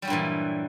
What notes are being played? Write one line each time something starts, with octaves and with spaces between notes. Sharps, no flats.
G2 A#2 E3 F#3 G3